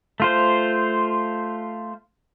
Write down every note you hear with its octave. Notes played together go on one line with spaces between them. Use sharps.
A3 F4 C5